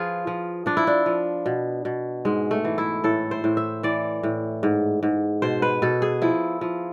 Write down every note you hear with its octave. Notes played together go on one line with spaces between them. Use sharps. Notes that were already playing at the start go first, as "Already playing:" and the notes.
Already playing: F3 F4 G#4 B4
F3
F3 D4
E4
D4
F3
B2
B2
G#2 G#3
A3
E3
E4
A2 A4
C5
A2
E5
E3 D5
A2
G#2
G#2
B2 C5
B4
B2 A4
G#4
F3 E4
F3